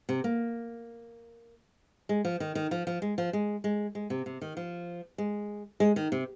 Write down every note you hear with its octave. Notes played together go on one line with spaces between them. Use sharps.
C3
A#3
G#3
F3
D#3
D#3
F3
F3
G#3
F3
G#3
G#3
G#3
C3
C3
D#3
F3
G#3
G#3
D#3
C3